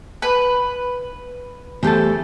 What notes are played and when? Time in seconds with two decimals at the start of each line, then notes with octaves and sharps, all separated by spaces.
0.22 B4
1.83 E2 A3 G4 A4 C5